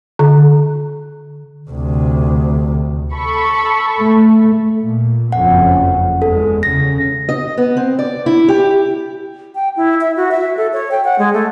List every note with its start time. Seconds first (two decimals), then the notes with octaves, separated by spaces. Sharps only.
0.19 D3
1.70 D2 C3
3.15 A4 B5 C#6
4.00 A3
4.83 A#2
5.32 F#1 F2 C#4 F#5
6.22 E2 G#3 A4
6.63 C#3 A#6
7.29 D#5
7.57 B3
7.77 C4
7.99 D5
8.26 E4
8.48 G4
9.55 G5
9.77 E4
10.01 E5
10.17 F#4
10.32 E5
10.57 A4
10.73 C#5
10.91 G5
11.04 F#5
11.19 G#3
11.33 A3